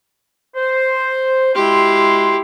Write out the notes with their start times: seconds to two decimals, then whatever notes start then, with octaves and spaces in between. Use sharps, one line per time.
0.56 C5
1.56 G#3 E4 F#4 G4 C6